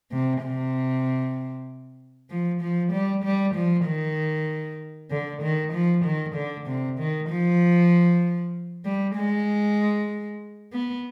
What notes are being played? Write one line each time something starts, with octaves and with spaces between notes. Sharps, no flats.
C3
C3
F3
F3
G3
G3
F3
D#3
D3
D#3
F3
D#3
D3
C3
D#3
F3
G3
G#3
B3